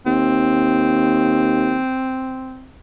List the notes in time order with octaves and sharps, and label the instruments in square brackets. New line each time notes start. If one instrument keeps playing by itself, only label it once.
[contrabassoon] D#2 [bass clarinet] C4